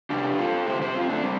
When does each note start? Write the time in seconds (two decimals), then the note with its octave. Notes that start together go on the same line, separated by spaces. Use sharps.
0.10 F2 C3 D4 G4
0.39 F4 A4
0.67 G2 D3 G4 C5
0.81 G4 C5
0.95 C4 F4
1.09 A3 D4
1.23 G3 C4